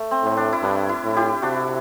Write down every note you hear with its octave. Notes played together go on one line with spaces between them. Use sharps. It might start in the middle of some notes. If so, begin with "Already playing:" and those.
Already playing: A3
C4
A2
D4
E4
G2 D4
E4
A2
E4 G4
C3 D4 F#4